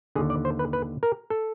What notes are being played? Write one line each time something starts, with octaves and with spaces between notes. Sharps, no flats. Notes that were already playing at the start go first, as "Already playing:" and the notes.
D#2 D3 G#4
D5
C5
B4
B4
A#4
A4